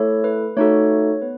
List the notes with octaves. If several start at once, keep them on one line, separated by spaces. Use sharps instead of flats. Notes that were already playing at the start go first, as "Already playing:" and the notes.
Already playing: A3 E4 A4 C#5
B4
A3 D#4 F#4 A4 C#5
B3 B4